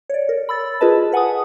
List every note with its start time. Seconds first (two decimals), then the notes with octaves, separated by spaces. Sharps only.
0.10 C#5 D5
0.29 A#4
0.49 B5 E6 A6
0.81 F4 G#4 A#4 B4 D#5 A5
1.12 B4 F#5 G#5 A5 D#6